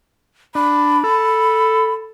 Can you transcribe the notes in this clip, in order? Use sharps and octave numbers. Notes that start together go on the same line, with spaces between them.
D4 B5
A4